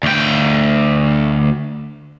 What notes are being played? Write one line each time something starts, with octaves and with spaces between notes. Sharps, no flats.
D2 G5